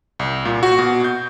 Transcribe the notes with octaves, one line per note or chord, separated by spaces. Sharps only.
C2
A#2
F#4
B2
G6